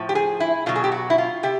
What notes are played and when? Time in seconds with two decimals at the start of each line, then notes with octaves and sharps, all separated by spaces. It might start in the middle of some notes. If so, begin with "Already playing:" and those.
Already playing: A2 F3
0.09 G4
0.15 G#4
0.40 E4
0.66 B2 F#3 F4
0.76 G#4
0.84 G4
0.92 F#4
1.10 E4
1.18 F4
1.43 C3 G4